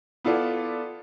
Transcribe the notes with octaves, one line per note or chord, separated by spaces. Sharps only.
B3 E4 F4 A4 D5